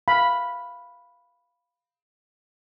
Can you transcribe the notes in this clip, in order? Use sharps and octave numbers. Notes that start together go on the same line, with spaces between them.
F5 B5